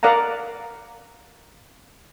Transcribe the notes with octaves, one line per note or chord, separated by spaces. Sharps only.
A#4 D5 F5 F#5 A#5